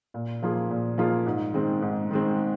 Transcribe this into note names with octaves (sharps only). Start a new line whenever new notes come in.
A#2
F3 A#3 F4 G#4
A#2
F3 A#3 F4 G#4
G#2
D#3 G#3 C4
G#2
D#3 G#3 C4